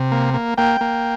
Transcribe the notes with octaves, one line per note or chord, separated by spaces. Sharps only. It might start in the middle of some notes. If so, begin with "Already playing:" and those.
Already playing: C3
A#3
A#3
A#3 G5
A#3